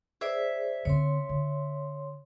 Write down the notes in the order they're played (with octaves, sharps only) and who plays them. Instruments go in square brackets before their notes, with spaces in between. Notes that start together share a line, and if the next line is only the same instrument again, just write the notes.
[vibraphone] G#4 C5 D5 [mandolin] E5
[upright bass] D3 C4 [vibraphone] C#5 C6
[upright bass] D3